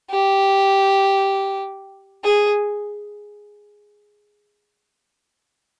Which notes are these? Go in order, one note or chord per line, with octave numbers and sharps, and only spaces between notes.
G4
G#4